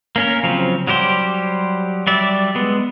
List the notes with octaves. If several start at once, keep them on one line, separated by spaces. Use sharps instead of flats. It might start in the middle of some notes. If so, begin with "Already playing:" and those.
A#3 C#4 A#4
C#3 F3 F#3 C4
F#3 G3 G4 C5
F#3 G3 D5 E5
G#3 B3